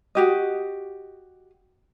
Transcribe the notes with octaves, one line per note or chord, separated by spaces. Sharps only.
F#4 G4 D#5